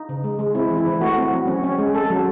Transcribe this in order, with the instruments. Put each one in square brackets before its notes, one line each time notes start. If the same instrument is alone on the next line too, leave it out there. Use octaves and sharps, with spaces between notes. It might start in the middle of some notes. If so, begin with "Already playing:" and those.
Already playing: [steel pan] D#4
C#3
G#3
G#3
C4 E4
E3
E4
E3
A3 F#4
C4
F#3
C#4
C#4
G#3
C#4 A4
F#3